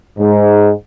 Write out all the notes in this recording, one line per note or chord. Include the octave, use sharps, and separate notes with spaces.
G#2